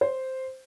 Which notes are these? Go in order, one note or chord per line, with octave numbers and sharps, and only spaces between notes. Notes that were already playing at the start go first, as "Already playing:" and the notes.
C5